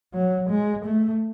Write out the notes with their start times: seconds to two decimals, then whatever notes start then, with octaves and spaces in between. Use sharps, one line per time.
0.14 F#3
0.49 G#3
0.85 A3